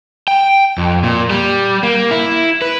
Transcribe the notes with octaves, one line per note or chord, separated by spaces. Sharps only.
G5
F2
A#2
G3
A#3
E4
B4